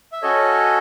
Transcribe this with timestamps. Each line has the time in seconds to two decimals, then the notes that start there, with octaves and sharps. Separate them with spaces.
0.12 E5
0.22 C#4 F#4 A4 C#5 D#5